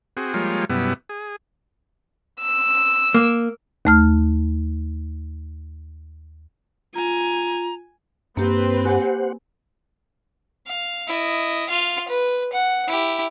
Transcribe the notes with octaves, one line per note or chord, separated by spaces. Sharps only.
C4 F#4 G#4
F3 G3 G#3 A#3 F4 C#5
F#2 B2 G3 B3 E4
G#4
E6
A#3
D#2 A3 F6
F4 G#5 A#5
G2 A#3 C4 G4 B4
G4 C5 F#5 G#5
F5
E4 D#5
F4 F5
B4
F#5
E4 G4